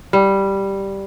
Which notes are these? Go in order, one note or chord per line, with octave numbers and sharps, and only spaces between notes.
G3